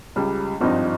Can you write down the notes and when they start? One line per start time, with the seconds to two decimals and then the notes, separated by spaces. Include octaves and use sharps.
0.16 C#2 C#3 G3
0.61 G#1 G2 F3 C4 D#4